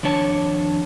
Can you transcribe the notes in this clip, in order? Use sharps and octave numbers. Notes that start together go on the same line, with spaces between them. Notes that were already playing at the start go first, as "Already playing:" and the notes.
F2 D#3 D4 C#5 A5